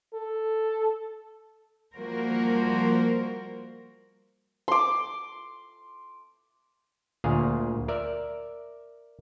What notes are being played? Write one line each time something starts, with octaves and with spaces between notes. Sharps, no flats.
A4
F3 G3 A#3 F#4 A#4 C5
C6 D6
D2 A#2 G#4 F5
A#4 D5 E5